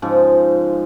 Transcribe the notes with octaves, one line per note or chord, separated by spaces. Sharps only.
G#2 C#3 F3